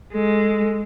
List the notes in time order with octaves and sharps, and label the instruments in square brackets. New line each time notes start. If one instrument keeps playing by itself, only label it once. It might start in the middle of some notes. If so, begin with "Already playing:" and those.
[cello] G#3 [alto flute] A4